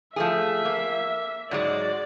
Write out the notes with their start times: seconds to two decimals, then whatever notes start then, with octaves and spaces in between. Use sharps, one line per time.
0.16 F3 A3 G#4 E5
0.65 A#3
1.51 G#2 F#3 G#3 D5